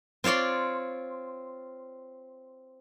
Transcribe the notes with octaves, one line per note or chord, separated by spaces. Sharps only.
C4 F4 C#5 D5 C6